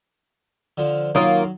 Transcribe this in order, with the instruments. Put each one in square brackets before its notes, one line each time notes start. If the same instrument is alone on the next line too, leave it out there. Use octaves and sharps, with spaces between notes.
[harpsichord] D3 F3
[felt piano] D#3 C#5 D#6 [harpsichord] F#3 [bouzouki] A#3 F4